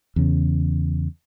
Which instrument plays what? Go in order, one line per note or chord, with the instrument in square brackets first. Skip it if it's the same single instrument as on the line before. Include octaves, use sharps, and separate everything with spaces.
[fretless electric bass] E2 C#3